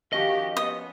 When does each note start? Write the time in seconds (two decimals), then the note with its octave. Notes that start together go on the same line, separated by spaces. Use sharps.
0.13 D#3 F3 C#4 F#4 G4 D#5
0.57 B3 D#6